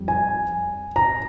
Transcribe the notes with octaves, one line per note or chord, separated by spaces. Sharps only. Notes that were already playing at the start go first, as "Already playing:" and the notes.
Already playing: F2 G3
G#5
A#5